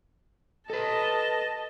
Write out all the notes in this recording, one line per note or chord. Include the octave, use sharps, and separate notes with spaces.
A4 B4 D#5 A5